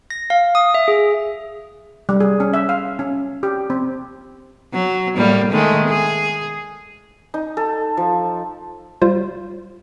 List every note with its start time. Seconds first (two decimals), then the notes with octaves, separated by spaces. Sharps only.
0.10 A#6
0.30 F5
0.55 D#6
0.74 E5
0.88 G#4
2.09 G3
2.20 G#4
2.40 C#4
2.53 E5
2.69 F5
2.99 C#4
3.43 G4
3.70 C4
4.73 F#3
5.16 A2 G3 A#3
5.52 D#3 G#3 A3
5.89 G#4
7.34 D#4
7.57 A4
7.97 F3
9.02 G3 F4 C5